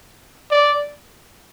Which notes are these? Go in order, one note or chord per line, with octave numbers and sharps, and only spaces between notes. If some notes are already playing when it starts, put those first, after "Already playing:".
D5